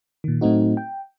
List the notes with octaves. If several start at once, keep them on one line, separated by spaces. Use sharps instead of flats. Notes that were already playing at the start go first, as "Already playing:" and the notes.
A#2 D#3
A2 F#3 A3 C4 D#4 F#4
G5